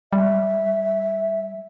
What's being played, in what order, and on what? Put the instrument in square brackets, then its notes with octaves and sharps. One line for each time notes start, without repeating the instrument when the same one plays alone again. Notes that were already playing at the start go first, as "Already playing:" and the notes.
[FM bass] G3 [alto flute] E5